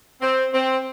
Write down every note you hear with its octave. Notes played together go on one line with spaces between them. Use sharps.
C4
C4